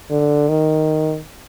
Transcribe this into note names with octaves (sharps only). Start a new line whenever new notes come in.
D3
D#3